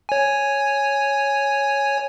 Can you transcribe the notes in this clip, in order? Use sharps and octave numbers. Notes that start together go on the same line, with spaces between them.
C#5 G#5